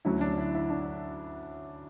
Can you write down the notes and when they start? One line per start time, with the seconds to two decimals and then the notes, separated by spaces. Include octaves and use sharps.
0.05 D2 D3 F#3 C#4 E4
0.21 D4
0.38 E4
0.55 E4
0.70 D4